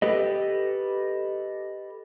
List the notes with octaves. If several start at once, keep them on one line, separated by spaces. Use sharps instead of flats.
G4 A4 B4 D#5